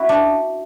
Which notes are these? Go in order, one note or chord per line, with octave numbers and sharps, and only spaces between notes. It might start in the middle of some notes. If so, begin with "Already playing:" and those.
Already playing: E4 F#4
D4